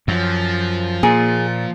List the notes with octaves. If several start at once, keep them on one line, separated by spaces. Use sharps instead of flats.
F#2 F3
A#2 A#3 G#4